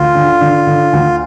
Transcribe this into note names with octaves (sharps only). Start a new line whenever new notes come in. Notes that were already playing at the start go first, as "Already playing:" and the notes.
Already playing: D2 F4
D3
D3
D3
D2